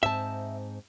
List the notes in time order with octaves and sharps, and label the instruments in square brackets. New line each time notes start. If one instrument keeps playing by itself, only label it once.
[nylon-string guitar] G#2 C4 A5 [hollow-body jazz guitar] E5